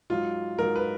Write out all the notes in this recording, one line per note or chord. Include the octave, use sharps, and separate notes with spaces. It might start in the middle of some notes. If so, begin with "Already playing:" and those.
G#2 F#3 F4
G#2 F#3 A#4
B4